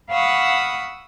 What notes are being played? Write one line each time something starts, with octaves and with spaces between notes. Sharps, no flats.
F5 F#5 B5 C#6 D#6 E6